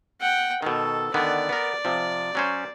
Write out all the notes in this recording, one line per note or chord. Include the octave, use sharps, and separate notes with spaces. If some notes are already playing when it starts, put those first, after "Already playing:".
F#5 G5
B2 D#3 A4
D3 D#3 B3 D5
B3 A#4
C3 F3
F#3 C#4 C5